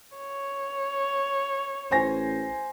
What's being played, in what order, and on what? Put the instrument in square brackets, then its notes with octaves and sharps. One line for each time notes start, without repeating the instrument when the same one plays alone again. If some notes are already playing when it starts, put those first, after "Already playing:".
[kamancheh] C#5
[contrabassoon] A1 [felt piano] C5 G#5 A#6